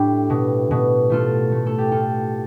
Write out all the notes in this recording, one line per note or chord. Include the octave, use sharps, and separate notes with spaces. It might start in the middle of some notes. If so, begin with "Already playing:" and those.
Already playing: A2 G3 D4 E4 G4
B2
B2
A3 F4 A4
A3
A4
G4
A2 F4 A4